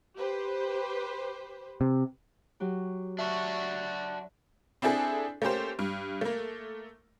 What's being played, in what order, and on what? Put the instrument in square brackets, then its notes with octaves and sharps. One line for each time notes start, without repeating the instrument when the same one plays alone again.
[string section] G4 B4 C5
[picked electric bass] C3
[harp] F#3 F#4 G4
[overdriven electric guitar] D4 F#4 [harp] E5 A5 C#6
[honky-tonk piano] C4 D4 E4 G#4 A4
A3 A#3 C#4 G4 C5
G2
A3 A#3